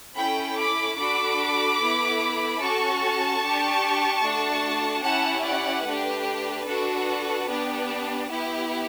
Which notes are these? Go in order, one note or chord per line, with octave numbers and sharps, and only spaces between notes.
C#4 E4 A4 G5 B5
B5 D6
D4 F#4 A4 B5 D6
B3 E4 A4
C#4 F#4 A4 A5 C#6
D4 G4
A3 D4 F#4
C#4 E4 G4 F#5 A5
D5 F#5
A3 D4 G4 B4
D4 F#4 A4
B3 D4 G4
B3 E4 G4